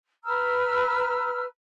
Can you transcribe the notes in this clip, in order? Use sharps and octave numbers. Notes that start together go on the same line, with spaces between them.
B4 A#5 E6 F6